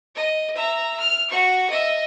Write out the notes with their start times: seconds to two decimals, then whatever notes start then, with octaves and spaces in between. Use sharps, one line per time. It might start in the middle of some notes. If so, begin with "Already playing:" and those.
0.16 D#5
0.56 E5 A#5
1.00 F6
1.30 F#4 C#6
1.70 D#5 E5